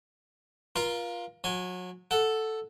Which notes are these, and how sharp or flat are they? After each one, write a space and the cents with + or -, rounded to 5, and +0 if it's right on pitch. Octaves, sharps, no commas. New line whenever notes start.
F4 +0 A#4 +45 A#5 +0
F#3 -30 G#5 +0
A4 +0 F#5 +0